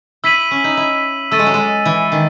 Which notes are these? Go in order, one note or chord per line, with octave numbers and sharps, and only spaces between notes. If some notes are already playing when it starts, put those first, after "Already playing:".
E4 E6 B6 D#7 F#7
C#4
D#4
E4
A3 E6 A6 D#7
G#3
F#3
G#3
E3
D#3